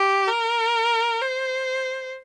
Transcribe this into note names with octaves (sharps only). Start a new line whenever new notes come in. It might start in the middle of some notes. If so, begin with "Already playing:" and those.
Already playing: G4
A#4
C5